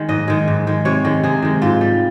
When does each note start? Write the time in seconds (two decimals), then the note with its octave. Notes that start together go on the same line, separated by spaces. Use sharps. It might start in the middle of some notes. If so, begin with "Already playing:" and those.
Already playing: D#3 G#3
0.09 G#2 D#5
0.28 D#3 G#3
0.48 G#2
0.67 D#3 G#3
0.85 C3 C#5
1.05 D#3 G#3
1.24 C3 G#4
1.42 D#3 G#3
1.62 G#2 F4
1.81 G3